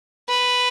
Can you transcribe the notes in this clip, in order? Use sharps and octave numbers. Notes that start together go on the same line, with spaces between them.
B4